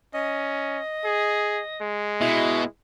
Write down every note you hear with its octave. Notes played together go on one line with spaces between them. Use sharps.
C#4 D#5
G#4
G#3
B2 E4